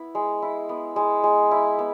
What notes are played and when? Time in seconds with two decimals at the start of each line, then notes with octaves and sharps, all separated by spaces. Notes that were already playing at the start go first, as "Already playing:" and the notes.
Already playing: B3 E4
0.15 G#3
0.42 E4
0.69 B3
0.96 G#3
1.24 G#3
1.51 E4
1.79 B3